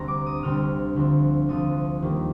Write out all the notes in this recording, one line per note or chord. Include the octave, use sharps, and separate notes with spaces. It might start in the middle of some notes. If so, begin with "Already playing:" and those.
Already playing: D2 D3 G3 C4 A#5
D6
D#6
D2 D3 G3 C4 F6
D2 D3 F3 C4
D2 D3 F3 C4 D#6
D#2 D#3 G3 A#3